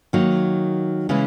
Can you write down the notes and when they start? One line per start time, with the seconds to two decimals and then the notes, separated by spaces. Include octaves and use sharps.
0.13 D#3 F#3 A#3 D#4
1.09 C#3 E3 G#3 C#4 E4